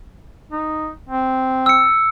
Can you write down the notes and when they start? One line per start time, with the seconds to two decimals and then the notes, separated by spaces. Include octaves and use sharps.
0.52 D#4
1.09 C4
1.66 E6 C#7